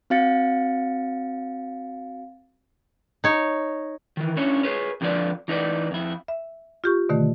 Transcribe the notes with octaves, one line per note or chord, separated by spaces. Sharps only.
C4 F#4 F5 A6 C#7
D#4 C#5
D#3 E3
C#4 D4 E4 C#5
G#4 B4 C#5
F2 D3 F3 B4 D5
E3 D#4 B4 D5
F2 E4
E5
F4 G4 C#6
B2 D3 D#3 A3